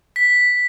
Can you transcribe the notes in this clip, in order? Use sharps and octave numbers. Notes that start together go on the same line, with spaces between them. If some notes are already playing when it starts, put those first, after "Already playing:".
B6